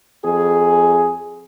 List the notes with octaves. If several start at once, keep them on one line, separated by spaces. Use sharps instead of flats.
F2 G#4